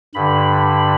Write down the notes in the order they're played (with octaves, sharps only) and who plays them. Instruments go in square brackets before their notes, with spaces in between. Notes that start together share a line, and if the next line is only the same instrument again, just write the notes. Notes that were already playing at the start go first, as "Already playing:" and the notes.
[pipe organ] G2 D3 B5